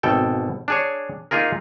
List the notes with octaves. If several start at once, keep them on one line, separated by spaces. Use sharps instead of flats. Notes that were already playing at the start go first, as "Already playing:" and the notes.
G#1 B2 A4 G5
D4 G#4 C#5
A#3 D#4 F4 G#4 A#4